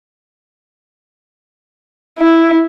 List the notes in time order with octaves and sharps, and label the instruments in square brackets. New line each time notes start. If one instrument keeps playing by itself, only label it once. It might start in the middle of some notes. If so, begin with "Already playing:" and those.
[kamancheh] E4